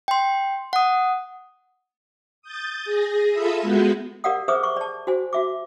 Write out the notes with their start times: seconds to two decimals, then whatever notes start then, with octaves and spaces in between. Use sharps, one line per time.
0.08 G5 C6
0.73 F#5 D#6
2.42 D#6 G6 A6
2.85 G#4 A#6
3.30 F4 A4 E5 B5 D#6 E6
3.62 G#3 B3 F#4 G6
4.24 G4 A#4 D5 F5 F#5 D#6
4.48 G#4 B4 C5 E5 D6 D#6
4.63 C#6 D6
4.77 D5 A5
5.07 F#4 C5 G#5
5.33 F#4 E5 D6